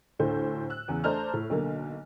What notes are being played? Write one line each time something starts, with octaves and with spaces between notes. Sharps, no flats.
D2 A2 D3 A4 C5
E6 F#6
E2 C#3
A3 D4 C5 A5 A#5 F6
A2
B1 D3 A#3